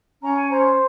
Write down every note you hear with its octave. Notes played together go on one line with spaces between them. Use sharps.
C#4 A#5
G#5
C5 A#5